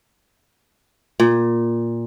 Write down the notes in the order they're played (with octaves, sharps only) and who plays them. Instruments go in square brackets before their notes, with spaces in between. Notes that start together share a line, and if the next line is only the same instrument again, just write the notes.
[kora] A#2